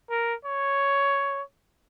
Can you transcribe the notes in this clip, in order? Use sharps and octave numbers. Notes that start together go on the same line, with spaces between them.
A#4
C#5